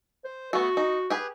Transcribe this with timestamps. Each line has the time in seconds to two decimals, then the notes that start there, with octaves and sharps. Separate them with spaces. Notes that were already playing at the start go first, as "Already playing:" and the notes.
0.25 C5
0.53 A3 B3 F#4
0.77 D#4
1.10 G4 G#4 B4